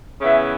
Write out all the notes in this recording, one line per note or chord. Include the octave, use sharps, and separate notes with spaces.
C#3 E3 B3 E5